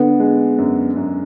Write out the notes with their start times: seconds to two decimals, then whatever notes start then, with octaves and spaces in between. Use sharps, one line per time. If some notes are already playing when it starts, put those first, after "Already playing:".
Already playing: D3 B3
0.20 G#3
0.58 F#2
0.97 F#2